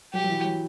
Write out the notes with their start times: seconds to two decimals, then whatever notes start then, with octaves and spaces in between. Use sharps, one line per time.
0.13 F#3 G4
0.24 F#3
0.29 E3
0.45 F#3